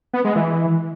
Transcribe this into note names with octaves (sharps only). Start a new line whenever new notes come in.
B3
G#3
E3